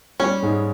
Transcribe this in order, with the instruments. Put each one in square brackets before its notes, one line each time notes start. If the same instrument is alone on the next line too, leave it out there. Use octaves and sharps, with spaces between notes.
[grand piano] G3 [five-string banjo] C#4
[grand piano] G#2 G#3